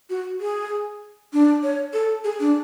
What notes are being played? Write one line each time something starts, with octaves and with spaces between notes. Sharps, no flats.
F#4
G#4
D4
C#5
A4
G#4
D4